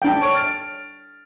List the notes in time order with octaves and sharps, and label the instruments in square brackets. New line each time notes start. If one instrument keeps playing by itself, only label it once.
[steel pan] D4 G5
[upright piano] C#5 C#6 D7
F6 A6 D7